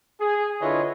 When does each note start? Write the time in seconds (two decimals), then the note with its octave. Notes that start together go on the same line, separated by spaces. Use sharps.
0.20 G#4
0.62 D3 E4 F4 B4 C#5 D#5